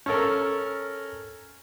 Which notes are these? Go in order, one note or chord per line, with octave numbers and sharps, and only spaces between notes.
C#4 A4 A#4